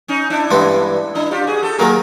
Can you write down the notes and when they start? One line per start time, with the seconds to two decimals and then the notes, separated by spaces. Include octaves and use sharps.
0.08 C#4 D#4
0.30 D4 E4
0.51 G2 E3 G#3 B3
1.15 D4 E4
1.31 F4 G4
1.47 F#4 G#4
1.63 G4 A4
1.78 D#3 F#3 A#3 G#4 A#4